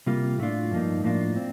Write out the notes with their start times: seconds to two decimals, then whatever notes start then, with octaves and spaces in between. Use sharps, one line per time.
0.06 C3 G3 A#3 F4
0.39 A2 A3 D4 F4
0.71 G2 F3 A#3 D#4
1.04 A2 F3 A#3 D4 F4
1.36 C4